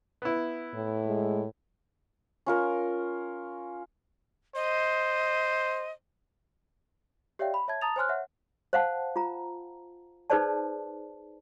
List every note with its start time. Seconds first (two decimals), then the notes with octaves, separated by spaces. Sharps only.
0.22 B3 E4
0.74 A2
1.07 G#3
2.46 C#4 F4 A#4
4.55 C5 D#5
7.39 G4 C#5 D5 E5 F5 G5
7.54 B5
7.68 C#5 E5 A5 G#6
7.81 A5 A#5 D#6 A6 F7
7.96 C5 C#5 G#5 C6 F6 F#6
8.09 C#5 E5 F#5
8.73 C5 F5 F#5 A5
9.16 F4 A#5
10.30 D#4 G#4 B4 C5 D5 A5